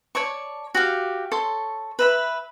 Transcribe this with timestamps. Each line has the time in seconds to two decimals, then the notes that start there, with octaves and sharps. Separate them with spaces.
0.15 C#5 D5 A5 C#6
0.75 F#4 G4 F5
1.32 A4 C#5 C6
1.99 B4 E5 B5